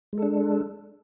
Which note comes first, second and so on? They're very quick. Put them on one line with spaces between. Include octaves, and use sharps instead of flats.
G#3 A4 D4